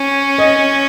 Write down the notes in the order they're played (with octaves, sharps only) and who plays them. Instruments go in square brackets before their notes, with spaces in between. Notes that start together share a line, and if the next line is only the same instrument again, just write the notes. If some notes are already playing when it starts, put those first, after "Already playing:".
Already playing: [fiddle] C#4
[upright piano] D#5